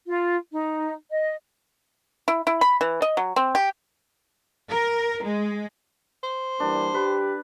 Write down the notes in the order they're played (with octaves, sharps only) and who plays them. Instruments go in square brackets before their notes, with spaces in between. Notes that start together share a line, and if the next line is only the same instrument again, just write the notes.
[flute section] F4
D#4
D#5
[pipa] E4
E4
B5
E3
D#5
F#3
C4
G4
[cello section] A#4
G#3
[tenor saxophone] C5
[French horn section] E3 G3 A#3 [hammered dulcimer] D4
[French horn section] G4 [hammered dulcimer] B4